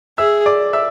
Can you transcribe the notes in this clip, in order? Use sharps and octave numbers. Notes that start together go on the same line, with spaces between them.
G#4 E5 E6
D5 D6
E5 E6